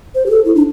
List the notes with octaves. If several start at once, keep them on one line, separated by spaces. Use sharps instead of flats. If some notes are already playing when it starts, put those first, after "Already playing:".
C5
G4
A4
E4
D4